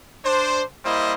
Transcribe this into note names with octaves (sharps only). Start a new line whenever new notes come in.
D4 C5
G3 A#3 E4 C5 D#5